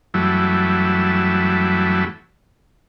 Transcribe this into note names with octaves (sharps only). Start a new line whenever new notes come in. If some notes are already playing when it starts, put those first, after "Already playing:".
F#2 E3 F#3 G3 A3 E4